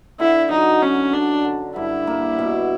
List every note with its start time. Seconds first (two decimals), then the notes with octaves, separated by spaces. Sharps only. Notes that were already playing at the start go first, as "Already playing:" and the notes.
0.19 D3 E4
0.50 F#3 D#4
0.82 F#3 C#4
1.13 D3 D4
1.45 D3
1.76 G2 E4
2.07 A#3
2.39 B2